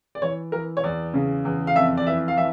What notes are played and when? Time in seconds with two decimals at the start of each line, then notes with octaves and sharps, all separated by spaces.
0.15 D5
0.22 E3 C#5
0.52 E3 A#4
0.77 C#5
0.83 E2 D5
1.14 C#3
1.45 E2
1.67 F5
1.75 F2 E5
1.97 D5
2.07 E3 E5
2.28 F5
2.37 E3 E5